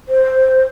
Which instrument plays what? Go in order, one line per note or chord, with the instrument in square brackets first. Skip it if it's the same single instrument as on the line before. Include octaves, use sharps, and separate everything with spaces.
[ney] C5